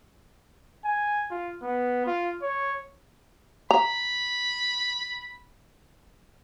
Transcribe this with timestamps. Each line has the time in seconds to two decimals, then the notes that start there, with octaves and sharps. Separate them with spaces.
0.85 G#5
1.31 F4
1.62 B3
2.07 F4
2.42 C#5
3.71 A#5 B5